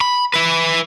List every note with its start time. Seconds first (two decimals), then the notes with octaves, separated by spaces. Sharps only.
0.01 B5
0.34 E4 B4